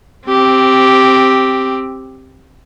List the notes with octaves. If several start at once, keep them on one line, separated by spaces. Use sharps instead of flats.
C4 G4